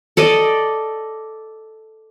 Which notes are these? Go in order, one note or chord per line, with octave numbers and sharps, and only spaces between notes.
A4 D5 D#5